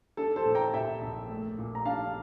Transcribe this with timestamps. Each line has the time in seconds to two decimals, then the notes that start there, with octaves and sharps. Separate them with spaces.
0.17 D4 A4
0.36 A4 C5
0.45 A#2
0.55 G5 A#5
0.74 A#2 E5 G5
1.01 A#1
1.29 A3
1.58 A#2
1.75 A#5
1.85 D4 F5 A5